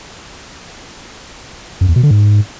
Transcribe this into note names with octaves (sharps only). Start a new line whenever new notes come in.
F#2
E2
B2
D3
G#2